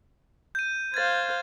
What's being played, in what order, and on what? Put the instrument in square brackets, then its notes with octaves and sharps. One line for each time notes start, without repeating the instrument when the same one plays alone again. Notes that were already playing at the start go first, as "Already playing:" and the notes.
[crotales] G6 D#7
[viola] C5 F5 [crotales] G#6 A6